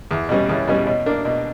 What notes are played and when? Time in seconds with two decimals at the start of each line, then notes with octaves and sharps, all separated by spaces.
0.11 E2
0.29 B2 G3 C#4
0.49 E2
0.68 B2 G3 C#4
0.87 B2
1.06 A#3 D4
1.25 B2